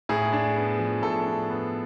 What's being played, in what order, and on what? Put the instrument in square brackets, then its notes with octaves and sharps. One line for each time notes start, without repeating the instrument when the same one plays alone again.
[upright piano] A2 [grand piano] G#4
[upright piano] D4
B3
F3
[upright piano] A2 [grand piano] A4
[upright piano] D4
B3